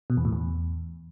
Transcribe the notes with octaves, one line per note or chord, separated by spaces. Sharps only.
B2
E2
A2
E2